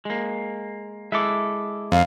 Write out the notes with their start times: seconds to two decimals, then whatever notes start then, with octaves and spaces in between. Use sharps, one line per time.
0.05 G#3 A#3
1.12 G#3 E4 A4 E5 D6
1.92 F2 F5